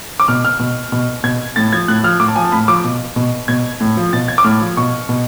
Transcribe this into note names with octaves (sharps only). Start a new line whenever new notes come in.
D6
B2 F6
F6
B2
B2
B2 G#6
A2 A6
F3 G#6
A2 F#6
F3 F6
A2 D6
A5
F3 G#5
A5
A2 B5
F3 D6
B2
B2
B2 G#6
A2
F3
B2 A6
G#6
D6
A2 F6
F3
B2 C#6
B2